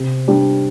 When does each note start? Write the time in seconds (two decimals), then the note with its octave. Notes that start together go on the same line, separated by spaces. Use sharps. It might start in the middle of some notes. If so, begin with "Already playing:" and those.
Already playing: C3
0.28 G3 D4 G4